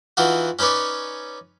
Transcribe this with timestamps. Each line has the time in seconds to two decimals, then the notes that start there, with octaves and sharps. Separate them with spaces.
0.17 E3 D#4 F4 F#4
0.59 C#4 D#4 B4 C#5 D5